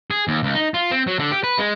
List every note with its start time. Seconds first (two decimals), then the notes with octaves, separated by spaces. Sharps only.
0.11 G#4
0.28 D#2
0.43 C#2
0.55 D#4
0.74 F4
0.91 C4
1.07 F#3
1.19 D3
1.31 G4
1.44 B4
1.58 G#3